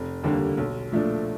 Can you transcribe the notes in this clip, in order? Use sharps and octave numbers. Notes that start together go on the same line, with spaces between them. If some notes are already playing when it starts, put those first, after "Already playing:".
Already playing: F1
D#2 D3 G3 A#3
B1
A#2 F3 A3 D4